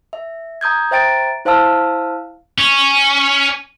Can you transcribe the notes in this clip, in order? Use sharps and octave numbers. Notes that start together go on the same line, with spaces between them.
E5
A#5 D#6 G6 G#6
C5 E5 G5 A#5 A6 D7
E4 C5 F5 A5 E6 F6
C#4